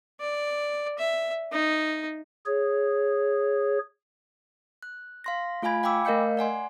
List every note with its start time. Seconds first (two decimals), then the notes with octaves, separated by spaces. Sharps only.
0.20 D5
0.98 E5
1.52 D#4
2.46 G#4 C#5
4.83 F#6
5.24 F5 C6 A#6
5.62 A3 F4 F5 G#5 B5 G#6
5.83 F5 G5 G#5 B5 D6 E6
6.05 A3 A#4 D#5 F5 G6 C#7
6.37 D5 F#5 G#5 C6